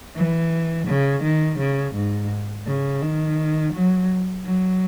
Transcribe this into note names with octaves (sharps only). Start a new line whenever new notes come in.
E3
C#3
D#3
C#3
G#2
C#3
D#3
F#3
F#3